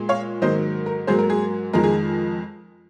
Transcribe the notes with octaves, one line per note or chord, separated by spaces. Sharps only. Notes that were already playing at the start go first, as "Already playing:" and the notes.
Already playing: A#2 G#3
C#5 F5
G#2 D#3 F#3 A#3 C5 D#5
A#4
G#2 F#3 A#3 G#4 C5
A#4
G#4
F2 D#3 G#3 A#4
G#4